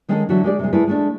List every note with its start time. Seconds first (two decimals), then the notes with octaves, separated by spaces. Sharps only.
0.09 D#3 G#3 C#4 A4 D#5
0.29 D3 E3 F#3 F#4 E5
0.44 G#3 G4 D5
0.59 C3 G#3
0.73 G#3 A3 E4 G#4 B4
0.87 G#3 A3 D4